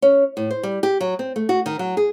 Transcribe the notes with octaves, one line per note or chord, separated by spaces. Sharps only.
C#4
A2
C5
G3
G4
F#3
C4
A3
F#4
D#3
F#3
G#4